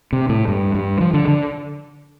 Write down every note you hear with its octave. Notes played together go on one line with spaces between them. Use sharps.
C3
A2
G2
G2
F3
D3
D3